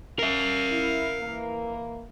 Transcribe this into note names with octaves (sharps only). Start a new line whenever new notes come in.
A#4 E5 F5
E4
E3 A#3